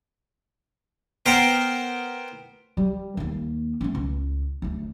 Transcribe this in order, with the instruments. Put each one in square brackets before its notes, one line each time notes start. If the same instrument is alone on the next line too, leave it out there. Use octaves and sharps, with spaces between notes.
[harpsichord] B3 A#4 C5 G5
[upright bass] G3
D#2 A#3
A3 C#4
C#2
D2 A3